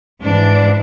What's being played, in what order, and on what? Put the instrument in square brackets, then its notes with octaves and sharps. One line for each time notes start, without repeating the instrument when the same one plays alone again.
[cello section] G#2 E3 D4